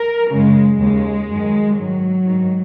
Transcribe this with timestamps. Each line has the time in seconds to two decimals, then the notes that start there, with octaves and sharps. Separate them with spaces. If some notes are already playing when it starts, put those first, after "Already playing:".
Already playing: A#4
0.32 F#2 C#3 G#3
0.81 D#2 C#3 G#3
1.29 F#2 D#3
1.78 G#2 D#3 F#3
2.26 G#2 D#3